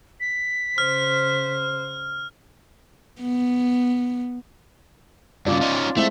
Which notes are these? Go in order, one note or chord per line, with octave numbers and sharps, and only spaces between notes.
B6
C#3 C5 F6
B3
G2 C#3 F4 D5
C#4 D#4
G#3 A3 C4 E4